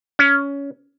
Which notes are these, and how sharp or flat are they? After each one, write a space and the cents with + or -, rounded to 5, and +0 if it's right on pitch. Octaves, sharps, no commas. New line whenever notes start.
C#4 +15